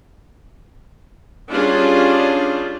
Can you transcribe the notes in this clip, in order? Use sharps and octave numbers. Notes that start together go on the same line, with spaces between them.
G3 C#4 D4 F4 G4 G#4